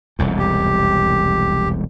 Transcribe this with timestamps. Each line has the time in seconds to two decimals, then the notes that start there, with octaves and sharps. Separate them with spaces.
0.19 E1 C2 F2
0.39 G4